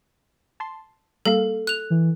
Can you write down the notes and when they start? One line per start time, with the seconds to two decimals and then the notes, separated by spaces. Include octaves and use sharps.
0.60 A5 C6
1.25 G3 A#3 A4 F5
1.67 F#6 F7
1.90 E3